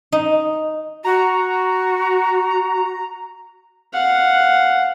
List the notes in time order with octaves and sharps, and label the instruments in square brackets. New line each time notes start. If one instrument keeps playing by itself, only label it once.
[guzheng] D#4
[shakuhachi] F#4 [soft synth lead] A#5
[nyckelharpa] F5 F#5